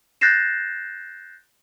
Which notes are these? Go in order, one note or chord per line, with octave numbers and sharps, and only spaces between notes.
F#6 G6 A6 A#6 C7 E7